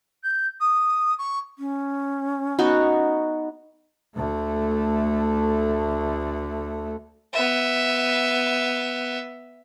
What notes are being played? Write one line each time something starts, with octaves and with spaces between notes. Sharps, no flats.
G6
D#6
C#6
C#4
B3 D#4 F#4
D2 A3
B3 E5